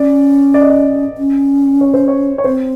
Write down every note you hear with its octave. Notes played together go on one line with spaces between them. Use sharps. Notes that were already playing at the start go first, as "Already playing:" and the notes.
Already playing: C#4 D5
D5
D#5
D5
C#4
C#5
C5
C#5
C#5
C4 C5